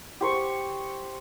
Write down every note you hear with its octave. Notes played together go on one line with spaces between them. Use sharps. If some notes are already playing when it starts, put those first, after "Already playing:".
G4 C5 C#6